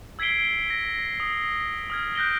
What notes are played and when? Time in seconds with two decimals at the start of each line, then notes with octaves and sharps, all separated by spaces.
0.19 E6 G#6 B6 C7 D7 G7
0.70 A#6
1.20 D#6
1.90 D#6 F6 G#6
2.15 F#6 G6 A#6 D7 G7